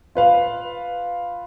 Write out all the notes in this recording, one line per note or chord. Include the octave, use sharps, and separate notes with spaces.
F4 B4 F5